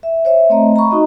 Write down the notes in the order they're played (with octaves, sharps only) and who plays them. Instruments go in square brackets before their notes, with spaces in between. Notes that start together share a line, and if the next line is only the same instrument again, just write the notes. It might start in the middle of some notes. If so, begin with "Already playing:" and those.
[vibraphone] E5
C5 C#5 E5
A3 C4 C#5 D#5 A#5
A#5 B5 C#6
D#4 F#4 D#5